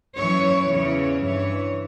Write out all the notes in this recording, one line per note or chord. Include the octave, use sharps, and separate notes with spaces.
F#2 E3 C#5
E2 C#3 E3 C#5
G2 E3 C#5